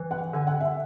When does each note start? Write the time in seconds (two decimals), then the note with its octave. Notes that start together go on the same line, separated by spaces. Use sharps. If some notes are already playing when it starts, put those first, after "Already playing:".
Already playing: E3
0.11 F#5
0.33 D3 G#5
0.47 F#5
0.60 E5